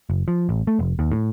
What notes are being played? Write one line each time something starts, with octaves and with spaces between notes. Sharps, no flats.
F#1
F3
A1
A3
F1
D#2
A2